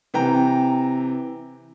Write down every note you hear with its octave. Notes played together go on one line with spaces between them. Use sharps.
C3 E3 G5 A#5